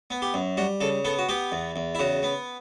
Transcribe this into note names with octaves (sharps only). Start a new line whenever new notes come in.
B3
G4
F#2
G3 F#4
C#3 A4
B3 A4
F#4
B3 G4
E2
E2
E4
C#3 F#4
B3